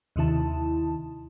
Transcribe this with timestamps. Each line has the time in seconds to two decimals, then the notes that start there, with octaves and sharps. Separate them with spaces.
0.16 D#2 C3 D#3 E4 A5